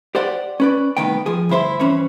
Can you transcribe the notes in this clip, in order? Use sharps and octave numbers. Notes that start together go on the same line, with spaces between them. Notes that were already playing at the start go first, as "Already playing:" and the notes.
G4 C5 D5 F#5
C#4 B4 D5
C2 A2 D#3 B3 G5
F3 G#4
D2 G2 E4 C5 E5
G2 E3 C#4 C5 C#5 B5